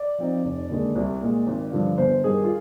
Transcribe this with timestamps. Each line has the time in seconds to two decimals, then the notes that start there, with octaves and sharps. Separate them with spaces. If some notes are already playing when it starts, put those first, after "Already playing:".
Already playing: D5
0.18 F3 C4 D#4
0.44 F1
0.69 D#2 D3 G#3
0.96 C2
1.21 A#2 G#3
1.47 G#1
1.72 G2 D3 F3
1.98 G1 C5
2.23 G2 D#3 G3 G#4
2.44 F4